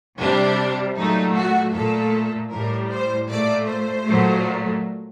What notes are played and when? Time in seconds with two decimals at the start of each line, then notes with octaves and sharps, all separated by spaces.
0.20 C3 G3 D4
0.97 A#2 F#3 A3 D#4
1.36 F#4
1.74 A#2 A3 A4
2.52 A2 G3 A#4
2.90 C5
3.29 A#2 A3 D5
3.67 C5
4.06 A#2 F#3 A3